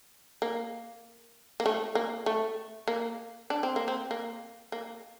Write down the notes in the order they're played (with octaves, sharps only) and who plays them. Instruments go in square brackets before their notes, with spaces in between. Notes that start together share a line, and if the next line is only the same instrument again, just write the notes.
[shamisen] A#3
A#3
A3
A#3
A3
A#3
D4
C4
A#3
C4
A#3
A#3